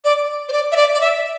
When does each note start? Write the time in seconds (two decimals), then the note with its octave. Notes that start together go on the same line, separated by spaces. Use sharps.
0.05 D5
0.49 C5
0.52 D5
0.72 E5
0.76 D5
0.94 D5
1.01 E5